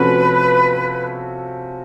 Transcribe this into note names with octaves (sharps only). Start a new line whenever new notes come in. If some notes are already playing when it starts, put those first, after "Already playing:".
Already playing: C3 F3 A3 C#4 F#4 B4